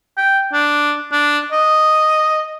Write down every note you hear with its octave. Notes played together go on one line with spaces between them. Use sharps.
G5
D4
D4
D#5